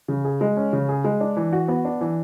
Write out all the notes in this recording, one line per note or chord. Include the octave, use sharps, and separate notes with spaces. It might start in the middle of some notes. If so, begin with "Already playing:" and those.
C#3
G#4
G#3
C#4
C#3
G#4
G#3
D4
E3
F#4
B3
D4
E3